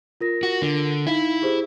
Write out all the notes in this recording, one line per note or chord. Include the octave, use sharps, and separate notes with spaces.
F4 A#4 A#6
F#4
D3
D#4 E4 F5
G4 G#4 C5